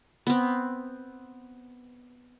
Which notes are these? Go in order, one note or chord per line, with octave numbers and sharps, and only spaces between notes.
B3 C4